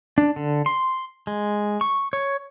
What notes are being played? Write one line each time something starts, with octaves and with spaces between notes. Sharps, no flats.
D4
D3
C6
G#3
C#6
C#5